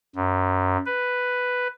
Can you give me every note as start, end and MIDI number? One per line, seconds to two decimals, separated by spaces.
0.16 0.77 42
0.86 1.67 71